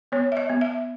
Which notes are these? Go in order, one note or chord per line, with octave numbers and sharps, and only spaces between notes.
B3 C#5
E5
D#5
B3
E5